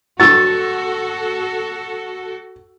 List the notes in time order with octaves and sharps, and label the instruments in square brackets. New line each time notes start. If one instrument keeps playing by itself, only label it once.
[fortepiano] G2 F#3 F#5 [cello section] F#4 A4 [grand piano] C#6 E6 [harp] A6